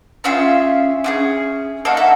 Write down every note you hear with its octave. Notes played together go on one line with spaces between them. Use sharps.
C#4 F4 G#4 E5
C#4 F4 G#4
A#3 D#4 F#4 A4 F5
E5